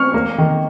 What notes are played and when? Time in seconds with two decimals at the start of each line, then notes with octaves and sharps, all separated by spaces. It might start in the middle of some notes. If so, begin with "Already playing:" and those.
Already playing: C#6 F6
0.14 A#3
0.38 D#3